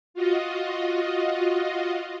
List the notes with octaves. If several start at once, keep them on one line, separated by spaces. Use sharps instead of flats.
F4 F#4 D#5